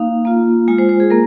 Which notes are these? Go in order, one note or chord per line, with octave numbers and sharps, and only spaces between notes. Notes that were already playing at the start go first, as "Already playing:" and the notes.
Already playing: A#3 D#4 F5
A#3 F4
G#3 F4 G#5
C5
C5
G#4
A#3 A#4